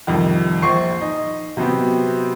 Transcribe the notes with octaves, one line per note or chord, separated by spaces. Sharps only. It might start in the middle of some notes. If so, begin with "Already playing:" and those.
C2 F2 D#3
A#1 C5 C#6 C7
D#4
C3 F#3 B3 C4